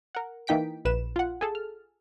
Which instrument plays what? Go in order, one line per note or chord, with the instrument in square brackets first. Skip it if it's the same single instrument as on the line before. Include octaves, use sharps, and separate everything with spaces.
[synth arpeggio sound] A#4 F#5
E3 A#3 D#4 G5 B6 D7
A#1 B4 E7
F4 F#5
G#4 A4 A5
F6